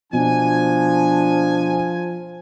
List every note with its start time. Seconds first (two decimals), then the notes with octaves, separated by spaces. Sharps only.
0.13 B2 F3 D4 G#5